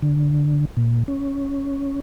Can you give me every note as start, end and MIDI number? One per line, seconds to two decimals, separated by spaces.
0.02 0.65 50
0.77 1.03 46
1.08 2.00 61